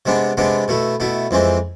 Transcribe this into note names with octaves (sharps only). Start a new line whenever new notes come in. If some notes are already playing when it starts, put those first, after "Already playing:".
C3 G#3 B3 D4
C3 G#3 B3 D4
B2 A3 E4
B2 A3 E4
F2 E3 G#3 C4